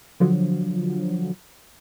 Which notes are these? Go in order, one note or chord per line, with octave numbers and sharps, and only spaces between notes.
D3 F3 F#3